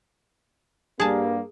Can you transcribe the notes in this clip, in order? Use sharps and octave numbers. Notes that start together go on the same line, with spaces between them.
G2 G3 A#3 G#4 A5